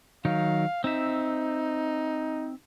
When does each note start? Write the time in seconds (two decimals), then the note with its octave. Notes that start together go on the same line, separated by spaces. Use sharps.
0.25 D#3 F#3 D#4 F5
0.84 C4 D#4 E5